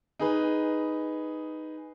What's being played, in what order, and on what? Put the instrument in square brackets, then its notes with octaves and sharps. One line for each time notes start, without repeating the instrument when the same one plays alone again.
[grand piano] D#4 G#4 B4